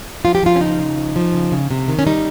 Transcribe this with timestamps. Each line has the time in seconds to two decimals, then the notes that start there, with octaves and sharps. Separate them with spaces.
0.25 F3 F4
0.35 G4
0.43 F3 F4
0.56 C#4
0.61 C#3 D#4
0.79 C#3
0.98 F3
1.16 F3
1.34 C#3
1.52 C#3
1.71 C3
1.88 D#3
1.99 C#4
2.07 G3 D#4